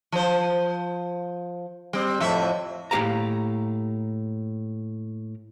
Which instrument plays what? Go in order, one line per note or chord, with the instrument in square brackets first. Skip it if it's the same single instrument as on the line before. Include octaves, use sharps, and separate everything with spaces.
[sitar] F3 C5
G3 C4
F2 A2 E5
[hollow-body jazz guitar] A2 A#3 G4 F5 A#5